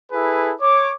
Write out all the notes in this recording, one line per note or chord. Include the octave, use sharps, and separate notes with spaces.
E4 G#4 A4 B4
C#5 D6